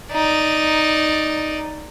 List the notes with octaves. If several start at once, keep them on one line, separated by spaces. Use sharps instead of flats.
D#4 D5